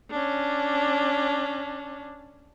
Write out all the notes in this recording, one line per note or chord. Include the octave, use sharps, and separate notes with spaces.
C#4 D4